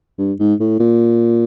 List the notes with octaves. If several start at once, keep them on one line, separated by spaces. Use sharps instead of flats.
G2
G#2
A2
A#2